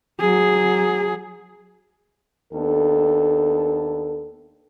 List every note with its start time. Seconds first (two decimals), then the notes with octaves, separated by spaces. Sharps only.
0.20 F#3 G#4
2.53 D#2 B3 D4 A4